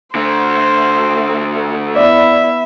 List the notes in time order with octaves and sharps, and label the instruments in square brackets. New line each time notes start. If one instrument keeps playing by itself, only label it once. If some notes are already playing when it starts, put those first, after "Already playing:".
[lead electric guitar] D3 A3 [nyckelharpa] C5
[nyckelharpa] B3 E4 [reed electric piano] D5 [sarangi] E5